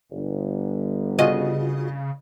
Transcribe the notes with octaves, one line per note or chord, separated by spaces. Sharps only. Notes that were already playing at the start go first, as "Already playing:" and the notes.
G1
C#3 F4 F#4 G#4 D#5